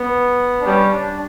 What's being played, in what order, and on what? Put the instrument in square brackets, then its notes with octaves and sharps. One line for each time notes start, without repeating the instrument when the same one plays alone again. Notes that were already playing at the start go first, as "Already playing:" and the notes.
Already playing: [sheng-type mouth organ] B3
D4
[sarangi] G3 [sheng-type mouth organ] C#4
[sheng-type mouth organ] D4